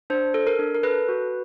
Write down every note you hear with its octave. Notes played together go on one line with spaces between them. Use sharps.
D4 C5
A4
A#4
D4
A#4
A4 B4
F#4